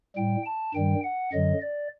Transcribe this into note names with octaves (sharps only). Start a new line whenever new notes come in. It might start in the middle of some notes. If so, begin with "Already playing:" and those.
A2 G3 G5
A5
G2 D#3 G3 G5
F#5
F#2 D3 F#3 D#5
D5